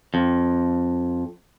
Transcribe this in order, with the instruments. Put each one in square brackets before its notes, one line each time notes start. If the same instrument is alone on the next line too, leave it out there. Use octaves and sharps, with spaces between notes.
[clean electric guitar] F2